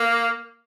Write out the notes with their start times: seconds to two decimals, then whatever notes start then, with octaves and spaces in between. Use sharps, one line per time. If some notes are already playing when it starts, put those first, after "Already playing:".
Already playing: A#3